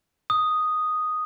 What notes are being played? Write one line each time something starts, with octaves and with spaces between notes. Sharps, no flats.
D#6